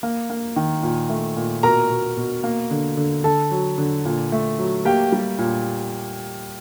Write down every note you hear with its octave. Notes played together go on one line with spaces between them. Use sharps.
A#3
A#3
D#3
A#2
A3
A#2
B2 A#4 A#5
B2
B2
A#3
D3
D3
D3 A4 A5
F#3
D3
A#2
A3
F#3
A#3 G4 G5
G3
A#2